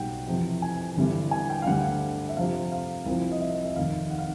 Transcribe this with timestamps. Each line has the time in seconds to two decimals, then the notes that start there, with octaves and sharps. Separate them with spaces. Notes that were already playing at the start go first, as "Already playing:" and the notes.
Already playing: B1 B2 G3 F#5 G5
0.28 F2 C3 E3
0.62 G#5
0.97 G1 G2 E3 G3
1.31 G#5
1.50 G5
1.62 F5
1.66 D2 D3 G3 F#5
2.29 E5
2.37 F2 C3 F3 F5
2.72 F5
3.06 C2 C3 F3
3.32 D#5
3.41 E5
3.53 D#5
3.64 E5
3.76 F1 D#2 D#3 F5
4.10 F#5
4.18 F5